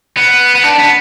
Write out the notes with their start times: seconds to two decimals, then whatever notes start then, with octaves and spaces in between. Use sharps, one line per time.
0.17 B3
0.55 B3
0.63 D4
0.79 B3